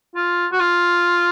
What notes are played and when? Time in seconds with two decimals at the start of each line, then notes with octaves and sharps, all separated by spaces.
0.15 F4
0.52 F#4
0.60 F4